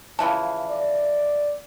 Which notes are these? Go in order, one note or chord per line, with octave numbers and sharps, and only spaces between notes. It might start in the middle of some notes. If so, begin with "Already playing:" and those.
C#3 E3 F3 A5
D5